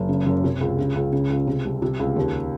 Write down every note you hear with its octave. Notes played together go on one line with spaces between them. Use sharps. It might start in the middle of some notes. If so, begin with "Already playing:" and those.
Already playing: F#1
C#3
F#2
C3
C#2
C#3
C#2
C#3
C#2
C3
C2
C3
C#2
D#2